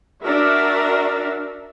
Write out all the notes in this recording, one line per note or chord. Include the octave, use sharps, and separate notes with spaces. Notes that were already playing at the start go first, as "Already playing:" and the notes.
D4 F#4 A#4 E5